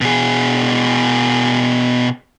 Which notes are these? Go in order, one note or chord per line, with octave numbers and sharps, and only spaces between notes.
B2 G#4